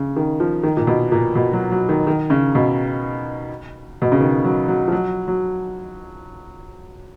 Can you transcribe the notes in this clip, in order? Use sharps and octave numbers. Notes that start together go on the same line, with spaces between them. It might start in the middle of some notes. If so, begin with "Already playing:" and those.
Already playing: C#3
D#3
F3
D#3
A#2
B2
A#2
B2
F#3
F#3
D#3
D#3
C#3
B2
B2
C#3
D#3
F#3
F#3
F3
F#3
F#3